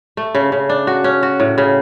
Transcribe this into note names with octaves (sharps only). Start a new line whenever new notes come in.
A3
C#3
C#3
D4
F#4
C#4
F#4
A2
C#3